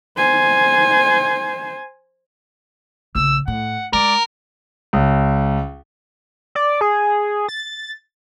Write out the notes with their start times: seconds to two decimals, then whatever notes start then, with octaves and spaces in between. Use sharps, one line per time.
0.17 C5 G#5
3.15 A#1 C#3 E6
3.48 A2 F#5
3.93 G#3 A#4 D5
4.93 C#2
6.55 D5
6.81 G#4
7.49 A6